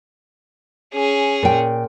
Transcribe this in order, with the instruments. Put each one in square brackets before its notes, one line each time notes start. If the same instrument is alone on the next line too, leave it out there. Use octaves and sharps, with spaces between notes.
[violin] C#4 G#4
[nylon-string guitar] A#2 G5